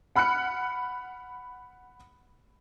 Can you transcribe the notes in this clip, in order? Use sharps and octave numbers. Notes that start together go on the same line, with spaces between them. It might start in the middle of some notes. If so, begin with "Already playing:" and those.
F#5 B5 F6 F#6 C#7